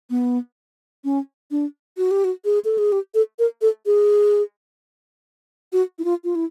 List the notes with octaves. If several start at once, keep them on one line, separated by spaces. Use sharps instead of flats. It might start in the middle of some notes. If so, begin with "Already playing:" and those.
B3
C#4
D4
F#4
G4
F#4
G#4
A4
G#4
G4
A4
A#4
A4
G#4
F#4
E4
F4
F4
E4